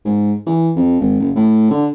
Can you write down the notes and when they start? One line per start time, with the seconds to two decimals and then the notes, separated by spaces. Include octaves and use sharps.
0.05 G#2
0.46 E3
0.76 F2
1.00 G#1
1.20 F#1
1.36 A2
1.70 D3